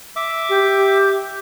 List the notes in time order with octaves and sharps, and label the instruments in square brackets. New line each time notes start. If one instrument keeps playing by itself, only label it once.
[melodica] E5 D6
[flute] G4